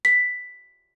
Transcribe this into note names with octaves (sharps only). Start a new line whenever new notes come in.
B6